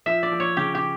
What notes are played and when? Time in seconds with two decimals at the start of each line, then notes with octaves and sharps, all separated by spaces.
0.06 F3 E5
0.23 D5
0.32 F3
0.40 C#5
0.57 C#3 G4
0.75 G4